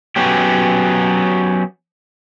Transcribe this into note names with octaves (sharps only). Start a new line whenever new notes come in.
F#3 B3 C#4 G4